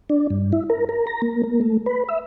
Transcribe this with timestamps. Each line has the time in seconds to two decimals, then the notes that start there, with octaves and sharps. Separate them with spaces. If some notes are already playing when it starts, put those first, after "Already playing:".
0.10 D4
0.30 G2
0.53 E4
0.70 A#4
0.89 A#4
1.07 A#5
1.22 A#3
1.43 A#3
1.61 A3
1.86 B4
2.09 E5